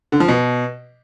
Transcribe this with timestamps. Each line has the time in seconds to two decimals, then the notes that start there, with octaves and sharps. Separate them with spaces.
0.12 D3
0.20 F3
0.28 B2